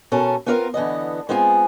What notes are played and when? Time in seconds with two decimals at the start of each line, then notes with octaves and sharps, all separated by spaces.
0.12 B2 C#4 A4 A#4
0.46 B3 C4 F4 A#4 D#5 F5
0.74 D3 E3 B3 D#5
1.29 G#3 B3 C4 F4 F#4 G#4